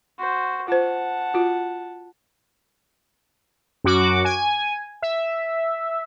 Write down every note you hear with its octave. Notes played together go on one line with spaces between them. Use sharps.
F#4 C5
F4 C5 F#5 A5
F4 F#4
F#2 F#4 D6
G#5
E5